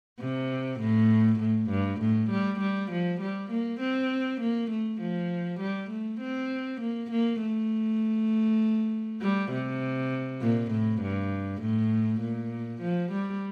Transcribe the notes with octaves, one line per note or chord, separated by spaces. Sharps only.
C3
A2
A2
G2
A2
G3
G3
F3
G3
A#3
C4
A#3
A3
F3
G3
A3
C4
A#3
A#3
A3
G3
C3
A#2
A2
G2
A2
A#2
F3
G3